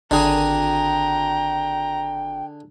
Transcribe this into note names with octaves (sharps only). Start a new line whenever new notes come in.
G#1 D3 G#4 G5 A#5